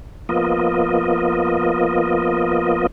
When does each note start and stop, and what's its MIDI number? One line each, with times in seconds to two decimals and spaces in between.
0.29 2.87 53
0.29 2.87 58
0.29 2.87 59
0.29 2.87 65
0.29 2.87 75